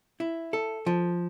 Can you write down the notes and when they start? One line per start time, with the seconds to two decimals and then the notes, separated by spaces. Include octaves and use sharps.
0.20 E4
0.53 A4
0.86 F3